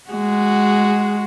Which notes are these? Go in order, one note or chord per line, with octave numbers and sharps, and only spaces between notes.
G#3 F#4